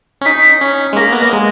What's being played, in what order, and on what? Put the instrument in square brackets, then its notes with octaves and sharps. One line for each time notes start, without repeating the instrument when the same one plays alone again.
[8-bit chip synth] C#4
[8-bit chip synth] D#4 [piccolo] B6
[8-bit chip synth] C#4
G#3
[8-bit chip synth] A#3 [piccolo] A#6
[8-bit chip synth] B3
[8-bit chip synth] A#3 [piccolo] A#6
[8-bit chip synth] G#3